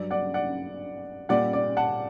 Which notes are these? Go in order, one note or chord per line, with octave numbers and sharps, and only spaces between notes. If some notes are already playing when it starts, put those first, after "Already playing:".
Already playing: G2 F#3 D5
D5 F#5
D5 F#5
A#2 G3 D5 F#5
D5
F#5 A5